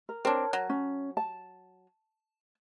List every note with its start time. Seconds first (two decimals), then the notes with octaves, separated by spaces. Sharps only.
0.09 A#4
0.25 C4 D4 A#4 C#5
0.53 F#3
0.70 C#4
1.17 A5